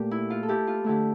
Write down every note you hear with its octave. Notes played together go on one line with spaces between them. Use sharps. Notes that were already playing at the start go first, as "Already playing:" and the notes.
Already playing: A#2 A3 G4
E4
F4
A4
E4 G4
F4
D3 A3 E4 G4